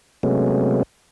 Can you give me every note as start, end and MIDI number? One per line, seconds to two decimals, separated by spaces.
0.23 0.83 48
0.23 0.83 54
0.23 0.83 56
0.23 0.83 57
0.23 0.83 59
0.23 0.83 61